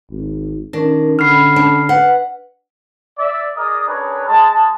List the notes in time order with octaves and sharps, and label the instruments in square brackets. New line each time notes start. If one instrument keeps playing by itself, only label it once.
[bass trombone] G#1
[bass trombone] D#3 [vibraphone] C#4 A#4 [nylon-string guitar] D4
[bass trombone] D3 [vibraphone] C#4 F#5 B5 [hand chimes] F6 C7
[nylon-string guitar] D4
[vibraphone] B4 [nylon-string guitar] F#5
[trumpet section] D5 E5
G#4 A#4 D5 D#5 D#6
C#4 D4 G#4 A#4 B4 C#5
G#3 A5